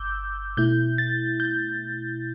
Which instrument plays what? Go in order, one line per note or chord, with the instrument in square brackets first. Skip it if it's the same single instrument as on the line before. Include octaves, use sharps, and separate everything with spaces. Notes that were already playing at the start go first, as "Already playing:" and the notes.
Already playing: [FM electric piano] G1 D6 E6 G6
B2 A3 E4 G6
A6
G6